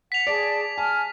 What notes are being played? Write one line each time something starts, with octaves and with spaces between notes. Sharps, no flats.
F#5 B6 F7
G#4 D5 A5
G#5 A5 F6